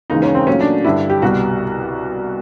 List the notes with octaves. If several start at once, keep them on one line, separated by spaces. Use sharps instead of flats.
D#2 C#3 E3 G#3 D#4
C#4
C4
A#2 F#3 A3 C#4
D4
G2 D3 G3 E4
G4
C2 B2 G3 F#4